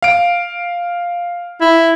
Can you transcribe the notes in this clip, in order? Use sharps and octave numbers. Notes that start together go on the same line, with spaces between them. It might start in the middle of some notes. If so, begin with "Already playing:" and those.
F5 D7
E4